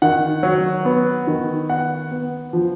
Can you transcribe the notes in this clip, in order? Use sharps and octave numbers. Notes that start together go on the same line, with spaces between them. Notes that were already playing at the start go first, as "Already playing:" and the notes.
D#3 F#5
F#3
B3
D#3
B3 F#5
B3
F3